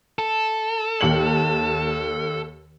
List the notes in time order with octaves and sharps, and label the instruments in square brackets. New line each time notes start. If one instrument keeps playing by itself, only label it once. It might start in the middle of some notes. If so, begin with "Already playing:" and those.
[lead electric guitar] A4
[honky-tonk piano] D#2 C#7 F#7